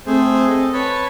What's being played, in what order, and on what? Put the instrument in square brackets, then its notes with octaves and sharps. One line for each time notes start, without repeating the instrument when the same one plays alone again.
[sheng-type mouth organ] A3 G#4 C5 [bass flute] C4
[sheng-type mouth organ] A4 D#5
B4 C#5 A5